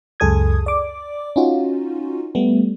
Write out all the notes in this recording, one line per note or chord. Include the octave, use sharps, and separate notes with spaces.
C#2 F#2 G#4 A4 D#6 G#6
D5 D6
C#4 D#4 F4 F#4
G3 A3 B3